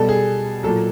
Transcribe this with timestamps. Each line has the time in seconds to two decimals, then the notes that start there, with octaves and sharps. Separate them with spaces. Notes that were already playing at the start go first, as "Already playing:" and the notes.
Already playing: B2 G3 A4
0.09 G#4
0.63 A#2 F#3 A4